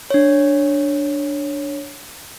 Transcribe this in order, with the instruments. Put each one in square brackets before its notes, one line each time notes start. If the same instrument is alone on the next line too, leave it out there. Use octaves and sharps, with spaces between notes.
[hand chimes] D4 C#5